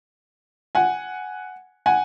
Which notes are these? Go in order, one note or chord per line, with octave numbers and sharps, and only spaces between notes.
F#5 G#5
F#5 G#5